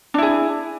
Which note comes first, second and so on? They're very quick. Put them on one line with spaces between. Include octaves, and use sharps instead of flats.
D4 E4 G#4